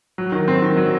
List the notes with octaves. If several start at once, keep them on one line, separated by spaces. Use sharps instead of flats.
F#3
D#3
C4
D#3
F#3